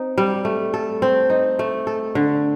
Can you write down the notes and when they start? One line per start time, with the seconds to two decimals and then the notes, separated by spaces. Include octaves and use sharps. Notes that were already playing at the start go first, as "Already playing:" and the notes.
Already playing: C4 D#4
0.18 G3
0.45 A3
0.74 A4
1.02 C4
1.30 D#4
1.59 A3
1.87 A4
2.15 D3